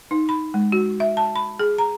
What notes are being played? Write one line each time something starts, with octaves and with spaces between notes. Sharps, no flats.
D#4
B5
G#3
F#4
E5
A5
B5
G#4
A#5